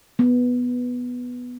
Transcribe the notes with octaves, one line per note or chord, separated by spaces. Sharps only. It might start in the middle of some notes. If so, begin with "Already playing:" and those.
B3